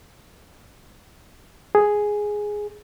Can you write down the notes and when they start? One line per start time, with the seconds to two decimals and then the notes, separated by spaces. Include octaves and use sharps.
1.75 G#4